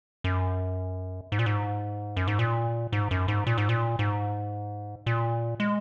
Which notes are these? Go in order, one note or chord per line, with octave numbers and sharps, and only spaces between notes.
F#2
G#2
A#2
G#2
F#2
G#2
A#2
G#2
F#2
G#2
A#2
G#2
A#2
G#2
A#2
G#3